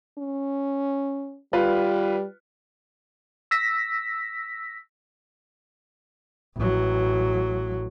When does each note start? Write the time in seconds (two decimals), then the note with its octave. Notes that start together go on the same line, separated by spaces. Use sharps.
0.18 C#4
1.53 G3 F4 B4
3.51 E6 A#6 B6
6.56 A1 F#3